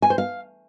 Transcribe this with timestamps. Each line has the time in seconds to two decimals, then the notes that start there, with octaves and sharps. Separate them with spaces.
0.02 G#5
0.10 C5
0.18 F5